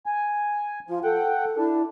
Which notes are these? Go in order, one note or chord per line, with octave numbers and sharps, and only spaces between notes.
G#5
F3 F4
A4 F#5 G5
D4 E4